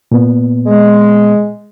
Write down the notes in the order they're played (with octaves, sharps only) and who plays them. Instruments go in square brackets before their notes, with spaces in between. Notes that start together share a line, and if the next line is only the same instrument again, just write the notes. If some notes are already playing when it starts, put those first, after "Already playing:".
[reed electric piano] A#2 B3
[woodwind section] G#3